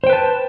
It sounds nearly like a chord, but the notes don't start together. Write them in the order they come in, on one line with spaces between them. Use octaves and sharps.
C5 G5 B4 A5